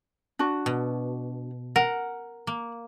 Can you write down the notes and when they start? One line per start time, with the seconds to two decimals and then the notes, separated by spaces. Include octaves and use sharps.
0.39 D4 F#4
0.66 B2
1.76 A#4 F#5
2.47 A#3